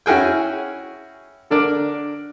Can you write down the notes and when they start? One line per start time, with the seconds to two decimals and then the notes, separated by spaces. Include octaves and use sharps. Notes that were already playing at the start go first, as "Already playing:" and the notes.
0.06 C#4 E4 F#4 G#4 G5
1.50 D3 D4 A#4 D5